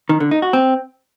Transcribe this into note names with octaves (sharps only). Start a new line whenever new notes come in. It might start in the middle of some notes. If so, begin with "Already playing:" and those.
D#3
D3
D#4
F#4
C4